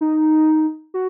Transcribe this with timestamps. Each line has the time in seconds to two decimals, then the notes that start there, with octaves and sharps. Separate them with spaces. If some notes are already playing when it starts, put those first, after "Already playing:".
0.01 D#4
0.94 F#4